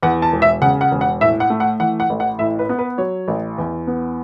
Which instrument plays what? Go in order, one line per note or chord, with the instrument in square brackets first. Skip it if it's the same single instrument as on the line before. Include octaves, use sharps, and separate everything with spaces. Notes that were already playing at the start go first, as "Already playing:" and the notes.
[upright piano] E2 F#5
A5
E1
E5
C#3 F#5
F#5
E1
F#5
A2 E5
F#5
A3
F#5
E3 F#5
F#5
A1
F#5
A2 E5
B4
B3
B4
F#3 C#5
A1
E2
B3